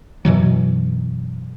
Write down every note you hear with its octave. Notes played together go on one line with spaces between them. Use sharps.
F#2 B2 E3 F#3